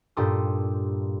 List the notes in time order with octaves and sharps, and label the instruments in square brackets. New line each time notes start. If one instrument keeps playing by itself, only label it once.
[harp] G2 A#2 G4 A4 C6 D#6